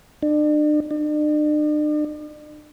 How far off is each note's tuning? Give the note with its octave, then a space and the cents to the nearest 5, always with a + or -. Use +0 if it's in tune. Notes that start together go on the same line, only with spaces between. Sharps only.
D4 +40
D4 +45